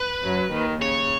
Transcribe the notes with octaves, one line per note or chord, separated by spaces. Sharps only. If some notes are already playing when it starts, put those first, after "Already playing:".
Already playing: B4
F#2 F#3
D#2 D#3
C#3 C#5